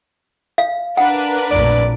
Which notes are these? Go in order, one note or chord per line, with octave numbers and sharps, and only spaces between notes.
F5
D4 A#4 B4 F#5
A#1 F2 A2 D5